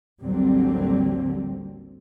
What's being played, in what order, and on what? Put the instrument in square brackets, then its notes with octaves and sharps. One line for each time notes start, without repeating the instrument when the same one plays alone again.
[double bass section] A1 D#2 D3 F#3 G3 C4